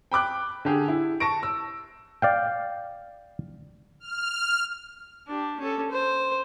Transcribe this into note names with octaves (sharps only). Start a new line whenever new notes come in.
G5 B5 D6 F#6
D3 G4 G#4
E4
A5 C#6 A#6 D7
E6
D5 F5 G5
F6
D4 G4
C#4 A4
C5